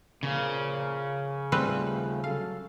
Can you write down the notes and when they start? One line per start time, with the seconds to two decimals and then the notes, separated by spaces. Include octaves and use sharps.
0.23 A#2 C#3 F3 A#3
1.52 D#2 F3 G3 A3 C4 B4
2.24 F#3 A4 F5